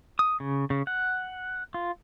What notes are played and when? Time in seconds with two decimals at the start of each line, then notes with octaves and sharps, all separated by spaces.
0.19 D#6
0.40 C#3
0.70 C#3
0.87 F#5
1.74 F4